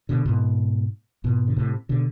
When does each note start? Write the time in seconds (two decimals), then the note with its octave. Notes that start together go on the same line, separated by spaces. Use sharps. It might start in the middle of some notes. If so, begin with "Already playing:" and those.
0.09 B2 D3
0.25 G#2 B2
1.24 G#2 B2
1.47 D3
1.57 A2 C3
1.89 B2 D3